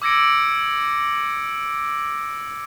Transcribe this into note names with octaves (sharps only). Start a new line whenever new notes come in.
D6 E6 G#6 A#6 C#7 D7